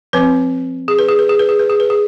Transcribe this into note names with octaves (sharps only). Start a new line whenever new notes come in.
F3 C4 B4
G#4
B4
G#4
B4
G#4
B4
G#4
B4
G#4
B4
G#4